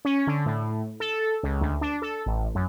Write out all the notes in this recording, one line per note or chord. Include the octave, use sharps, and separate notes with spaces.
C#4
D3
A2
A4
C#2
D2
D4
A4
A1
F#2